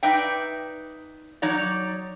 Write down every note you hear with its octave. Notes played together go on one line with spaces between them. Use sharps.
D#4 B4 D5 E5 G5
F#3 D#4 C#5 D5